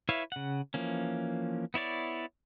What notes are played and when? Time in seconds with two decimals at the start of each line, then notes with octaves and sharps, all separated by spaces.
0.09 E4 B4 C#5 E5 F5
0.32 C#3 F#5
0.74 E3 F3 A#3 C#4
1.74 B3 E4 C#5 D5